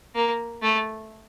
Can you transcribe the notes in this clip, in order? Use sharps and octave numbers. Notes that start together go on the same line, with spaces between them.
A#3
A3